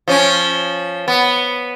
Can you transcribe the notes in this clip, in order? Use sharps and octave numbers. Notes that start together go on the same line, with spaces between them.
F3 C#4
B3